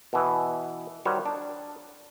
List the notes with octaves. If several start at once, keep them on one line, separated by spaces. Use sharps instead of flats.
B2 E3
D#3 G3 F#4 C5 C#5
D4